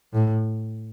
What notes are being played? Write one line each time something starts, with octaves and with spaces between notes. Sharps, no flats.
A2